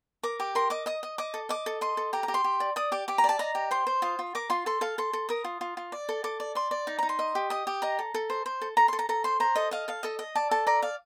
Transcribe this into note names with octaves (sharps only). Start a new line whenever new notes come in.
A#4 D6
G4 D6
A#4 C6
D#5 D6
D#5 D#6
D#5
D#5 D6
A4
D#5 D6
A4
D#5 C6
A4
G4 A#5
A#5
G4
C6
G4
D5
D5 D#6
G4 D6
G4 D6
A#5
D5
A5
D#5 A#5
G4
C5 C6
C5
F4 D#6
F4
A#4 D6
F4 C6
A4 C6
A4 F5
A4 C6
A4
A#4 D#6
F4
F4
F4
D5
A4
A4 D6
D5
D5 C6
D5
D#4
D#4 A#5
C6
D#5
G4
D#5 D#6
G4
D#5 A#5
A4
A4
C5
C5
A4
A4 A#5
C6
A4
A#5
A4 A#5
C5 C6
C5 A#5
A4 D#5
D#5 F5
A4 F5
A4 D#5
D#5
D5 A5
A4 A5
D5 A#5
D5 F5